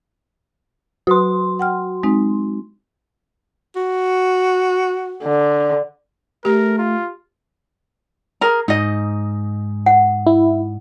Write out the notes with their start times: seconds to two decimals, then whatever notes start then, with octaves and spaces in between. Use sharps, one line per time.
1.07 F#3 F#4 B4 C6 D#6
1.59 F#5 G5 F6
2.03 G#3 C4 D#4
3.76 F#4
5.24 D3
6.45 A3 G4 A#4
6.78 F4
8.41 G#4 A#4 A#5
8.68 G#2 D#4 D#5
9.86 F#5
10.27 E4